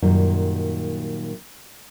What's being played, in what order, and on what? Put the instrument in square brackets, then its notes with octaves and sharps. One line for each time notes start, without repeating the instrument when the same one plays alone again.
[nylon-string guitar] F#2 A#2 D#3 G3